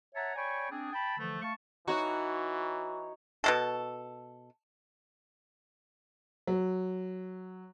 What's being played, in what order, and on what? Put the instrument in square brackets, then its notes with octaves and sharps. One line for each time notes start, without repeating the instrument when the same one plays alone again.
[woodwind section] C#5 E5 F#5 A5 A#5
C#5 D5 G5 G#5 B5 C#6
C4 D4 G#4
G5 A5 B5
D3 E3 F3 A3
A3 F5 A5 C#6
[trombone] E3 [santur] D#4 C#5 [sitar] F#4
[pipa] B2 G#3 A4
[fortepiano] F#3